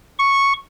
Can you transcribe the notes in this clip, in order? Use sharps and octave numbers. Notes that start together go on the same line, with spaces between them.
C#6